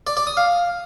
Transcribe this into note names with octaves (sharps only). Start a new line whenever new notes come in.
D5
D5
D#6
F5